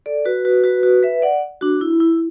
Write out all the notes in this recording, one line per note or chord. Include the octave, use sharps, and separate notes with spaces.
A4 D5
F#4 B4
F#4 B4
F#4 B4
F#4 B4
B4 E5
D5 F#5
D4 F#4
E4
E4